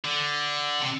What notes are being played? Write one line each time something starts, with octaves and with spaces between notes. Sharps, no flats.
D3
C3